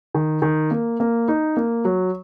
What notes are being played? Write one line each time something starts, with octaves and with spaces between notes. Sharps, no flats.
D#3
D#3
A#3
A#3
D#4
A#3
F#3